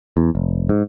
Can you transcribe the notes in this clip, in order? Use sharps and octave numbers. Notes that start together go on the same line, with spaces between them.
E2
F1
G#2